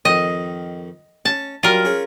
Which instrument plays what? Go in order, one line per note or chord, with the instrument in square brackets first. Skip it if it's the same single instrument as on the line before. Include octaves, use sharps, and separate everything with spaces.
[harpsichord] F2 D#3 [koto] D#5
[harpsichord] C#4 [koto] A5
[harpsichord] F#3 G3 D4 [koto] F4 A#4
[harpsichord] C#4 G#4 C#5